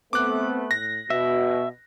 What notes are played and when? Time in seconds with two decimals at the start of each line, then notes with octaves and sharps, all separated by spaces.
0.13 A3 B3 C4 D6 F#6
0.71 A2 A#6
1.10 B2 F#4 E5